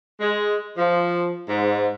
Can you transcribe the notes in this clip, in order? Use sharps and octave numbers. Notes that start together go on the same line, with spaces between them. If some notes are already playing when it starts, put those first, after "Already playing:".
G#3
F3
G#2